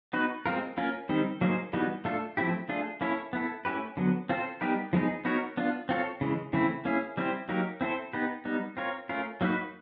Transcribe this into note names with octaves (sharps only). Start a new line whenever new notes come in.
B3 D#4 F#4 B4
G#3 C4 F4 A#4
A#3 C#4 F4 A#4
D#3 G3 C4 D#4
F#3 A#3 D#4 G#4 C5
E3 G3 B3 D#4 F#4
A3 D4 F4 A4
F3 A3 C4 E4 G4
A3 D4 F4 G#4
A#3 C#4 E4 A4 C#5
B3 E4 A4
A3 C#4 E4 G4 B4
D3 F#3 B3
C4 F4 A4 C5
G3 B3 D#4 G4 A#4
F3 G#3 B3 D#4 G#4
B3 D#4 F#4 A#4 C#5
B3 D4 F4
C4 F4 A4 C#5
C#3 E3 G#3
C#3 E3 A3 C4 E4
A#3 C#4 E4 G#4
G3 C4 E4 G4 C5
F#3 A#3 D#4 G4 A#4
C4 E4 A4 C5
B3 D#4 G4 B4
G3 B3 D#4
C4 F4 A#4 C#5
A3 C#4 F4 A#4
F#3 A#3 D#4 F#4 B4